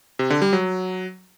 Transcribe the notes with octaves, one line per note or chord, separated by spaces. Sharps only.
C3
D3
G3
F#3